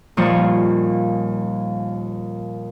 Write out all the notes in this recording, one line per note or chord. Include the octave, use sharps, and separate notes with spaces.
D#2 A#2 F3 G3 C5 C#6